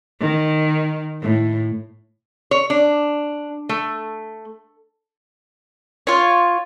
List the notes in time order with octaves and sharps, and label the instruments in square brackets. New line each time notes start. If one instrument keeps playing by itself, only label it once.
[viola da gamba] D#3
A2
[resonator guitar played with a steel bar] C#5
D4
A3
[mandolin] F4 C#5